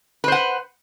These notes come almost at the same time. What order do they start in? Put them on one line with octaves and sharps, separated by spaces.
B4 C5 F#5